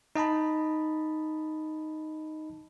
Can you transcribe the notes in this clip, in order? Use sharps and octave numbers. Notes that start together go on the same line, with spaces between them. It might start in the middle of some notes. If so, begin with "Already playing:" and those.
D#4 D#5 A5 B5